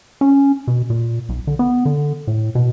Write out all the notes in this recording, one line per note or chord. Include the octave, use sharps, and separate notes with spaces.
C#4
B2
A#2
B1
D3
B3
D3
A2
B2